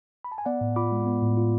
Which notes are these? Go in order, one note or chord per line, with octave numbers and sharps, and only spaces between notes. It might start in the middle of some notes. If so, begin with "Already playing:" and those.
B5
A5
G#5
B3 D5 F#5
A2
F4 B5 D6
G#3
B3
A2
F4